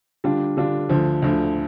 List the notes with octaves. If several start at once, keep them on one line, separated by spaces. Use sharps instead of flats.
D3 G3 D4 F4
D3 G3 D4 F4
D2 D3 F3
D2 D3 F3